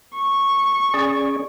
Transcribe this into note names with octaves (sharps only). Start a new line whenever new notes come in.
C#6
C#4 G#4 D5